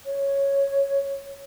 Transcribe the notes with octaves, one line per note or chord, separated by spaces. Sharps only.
C#5